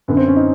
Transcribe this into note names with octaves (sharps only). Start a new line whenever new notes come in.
F#2 D3 B3
C4
C#4
D#4